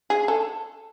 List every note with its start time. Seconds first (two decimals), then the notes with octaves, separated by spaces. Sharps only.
0.10 G#4
0.28 A4